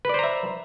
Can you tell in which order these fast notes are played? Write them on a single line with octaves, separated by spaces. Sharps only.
B4 D5 C5 A#5 E5